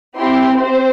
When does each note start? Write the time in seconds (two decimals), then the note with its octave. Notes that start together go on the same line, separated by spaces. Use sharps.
0.16 C4 E4 G4 C6
0.59 C4 G4 C5